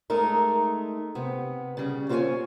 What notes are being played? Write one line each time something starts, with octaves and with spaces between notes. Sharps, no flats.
G#3 A3 D#4 A#4
C3 B3
C#3 G3
C4 F4 F#4 B4 C#5 G#5